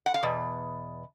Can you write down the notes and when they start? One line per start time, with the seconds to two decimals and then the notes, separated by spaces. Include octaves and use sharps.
0.06 F#5
0.14 F5
0.23 E2 B2